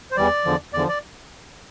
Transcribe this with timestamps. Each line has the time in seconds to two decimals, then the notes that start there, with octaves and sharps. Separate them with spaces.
0.11 C5
0.17 E2 E3 G3 D5
0.45 E2 D3 F3
0.73 E2 D3 F3 D5
0.88 D5